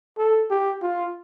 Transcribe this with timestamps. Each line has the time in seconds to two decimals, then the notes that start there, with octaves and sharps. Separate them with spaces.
0.18 A4
0.50 G4
0.82 F4